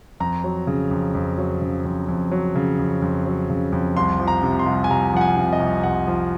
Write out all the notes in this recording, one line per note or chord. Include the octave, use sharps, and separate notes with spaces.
F2 A#5
F#3
C#3
F2
F2
F#3
C#3
F2
F2
F#3
C#3
F2
F2
F#3
C#3
F2
C2 C6
F3
A#5
C3
C6
C2
G#5
C2 A#5
F3 F#5
G#5
C3
D#5
C2
C2 F#5
F3